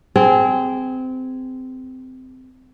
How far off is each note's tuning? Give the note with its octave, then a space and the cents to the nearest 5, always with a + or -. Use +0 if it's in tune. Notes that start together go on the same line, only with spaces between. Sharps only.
C4 -20 G#4 +0